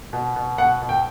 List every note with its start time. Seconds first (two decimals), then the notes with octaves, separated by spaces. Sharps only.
0.13 B2
0.36 B2
0.58 B2 F#5
0.82 B2
0.89 G5